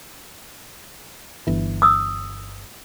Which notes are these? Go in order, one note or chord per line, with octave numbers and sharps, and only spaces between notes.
G1 E3
D#6 E6